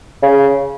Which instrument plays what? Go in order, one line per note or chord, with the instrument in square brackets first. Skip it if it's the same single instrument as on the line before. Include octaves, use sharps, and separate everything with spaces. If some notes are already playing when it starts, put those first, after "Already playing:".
[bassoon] C#3